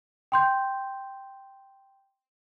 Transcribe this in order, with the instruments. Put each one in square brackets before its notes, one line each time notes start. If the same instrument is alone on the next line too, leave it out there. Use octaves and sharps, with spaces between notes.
[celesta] G5 C6 G6